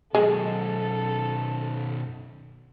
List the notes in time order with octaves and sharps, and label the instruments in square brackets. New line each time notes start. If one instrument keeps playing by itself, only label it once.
[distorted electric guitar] F#2 B2 [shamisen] G#3 [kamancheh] A4